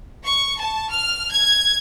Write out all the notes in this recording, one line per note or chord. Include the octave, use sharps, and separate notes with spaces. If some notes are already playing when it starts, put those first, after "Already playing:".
C#6
A5
F6
G#6